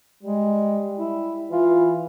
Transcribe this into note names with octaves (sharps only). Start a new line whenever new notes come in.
G3 G#3
E4
E3 F4